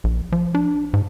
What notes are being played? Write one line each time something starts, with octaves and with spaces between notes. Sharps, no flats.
A#1
F3
D4
G#2